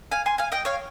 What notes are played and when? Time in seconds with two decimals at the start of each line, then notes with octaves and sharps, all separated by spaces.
0.12 F5 G#5
0.26 G#5 C6
0.38 F5 G#5
0.52 D#5 G5
0.65 C#5 F5